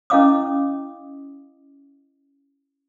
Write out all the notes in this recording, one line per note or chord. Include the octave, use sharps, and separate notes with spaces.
C#4 E4 D#5 F5 D6 D#6